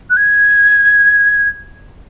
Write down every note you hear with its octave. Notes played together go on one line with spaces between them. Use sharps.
F#6
G#6